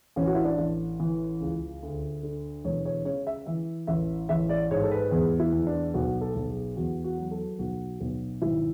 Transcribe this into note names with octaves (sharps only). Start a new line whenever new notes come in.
A1 C#4
F#4
E4
D4
A1
E3
C#2
D2
D3
E1 C#5
C#5
C#3 C#5
E5
E3 E5
A1 E5
A1 E5
D5
G#2 C#5
A4
B4
E2 G#4
E4
E2
D4
B1 F#4
A4
B1
G#4
E2 F#4
F#4
F#3
A4
B1 F#4
B1
G#1 E4